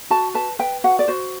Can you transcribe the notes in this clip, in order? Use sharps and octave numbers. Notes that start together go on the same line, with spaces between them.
F#4 A5
B4 A5
B4 G5
F#4 F#5
D5
F#4 C5